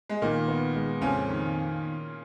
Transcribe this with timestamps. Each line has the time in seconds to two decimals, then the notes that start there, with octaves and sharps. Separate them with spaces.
0.09 G#3
0.22 A#2 D#3 A#3
0.48 B3
0.74 G#3
1.01 F2 C#3 C#4
1.29 D#3